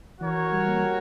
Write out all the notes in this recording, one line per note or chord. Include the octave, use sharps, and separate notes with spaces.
E3 F#4 A#4 C#5
G3
A#3
G4